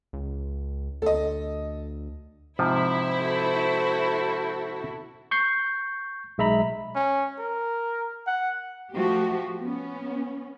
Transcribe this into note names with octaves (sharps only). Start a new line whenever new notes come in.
C#2
D2 A4 D#5
G#2 C3 F3 E4 C5
F#4 A4
C#6 G6 C7
B1 G#3 E5 A#5 B5 B6
C#4
A#4
F#5
F3 A3 F#4 G4
B3 C#4